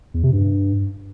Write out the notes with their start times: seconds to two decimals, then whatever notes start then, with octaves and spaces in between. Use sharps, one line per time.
0.14 E2
0.23 C3
0.33 G2